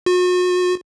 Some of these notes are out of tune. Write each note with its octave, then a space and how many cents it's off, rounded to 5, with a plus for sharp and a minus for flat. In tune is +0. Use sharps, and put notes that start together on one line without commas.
F#4 -40